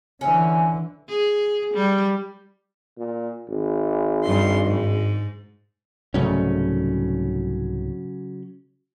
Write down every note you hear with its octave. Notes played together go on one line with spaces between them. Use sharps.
D3 E3 C#4
G#4
G3
A#2
G#1
G2 C6
G#2
C2 G#2 C#3 F#3 A3 C#4